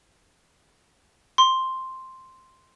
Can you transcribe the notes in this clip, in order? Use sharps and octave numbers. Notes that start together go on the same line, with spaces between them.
C6